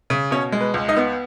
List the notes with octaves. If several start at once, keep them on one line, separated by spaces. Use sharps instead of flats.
C#3
B2 C#4 C#5
G#3
B4
C#2
D#4 D#5
B3